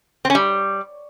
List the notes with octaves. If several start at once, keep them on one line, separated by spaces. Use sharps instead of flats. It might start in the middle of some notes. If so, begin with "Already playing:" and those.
C4
C#4
G3